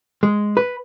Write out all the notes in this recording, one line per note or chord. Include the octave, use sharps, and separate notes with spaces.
G#3
B4